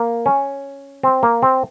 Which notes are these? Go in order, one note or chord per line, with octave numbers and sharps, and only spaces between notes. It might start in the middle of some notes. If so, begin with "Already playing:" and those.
Already playing: A#3
C#4
C4
A#3
C4